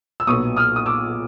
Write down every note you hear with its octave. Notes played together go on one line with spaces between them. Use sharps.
E6
B1 A#2 F#3 B3 C#6 D#6
D#6 F6
D#6
D6 E6